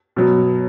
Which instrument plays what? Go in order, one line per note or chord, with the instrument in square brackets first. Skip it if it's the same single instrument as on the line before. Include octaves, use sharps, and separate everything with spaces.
[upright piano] B2 F#3